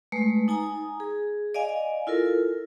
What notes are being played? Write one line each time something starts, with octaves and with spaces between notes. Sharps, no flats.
G#3 A3 B4
D#4 G#5 A#5 D#6
G#4
D5 D#5 F5 G#5
E4 F4 A4 A#4